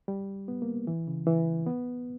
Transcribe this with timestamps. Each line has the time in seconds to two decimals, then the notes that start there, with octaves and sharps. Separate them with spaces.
0.08 G3
0.48 B3
0.62 A#3
0.87 E3
1.07 C#3
1.27 E3
1.66 B3